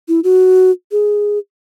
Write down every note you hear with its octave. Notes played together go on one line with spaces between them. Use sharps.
E4
F#4
G#4